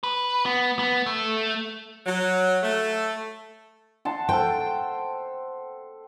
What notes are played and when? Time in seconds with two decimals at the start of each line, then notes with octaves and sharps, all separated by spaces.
0.03 B4
0.45 B3
0.79 B3
1.06 A3
2.06 F#3
2.63 A3
4.05 F#5 A5 C6
4.29 A4 C5 G5